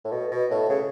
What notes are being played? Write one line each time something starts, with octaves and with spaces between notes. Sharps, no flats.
A2
B2
B2
A2
C#3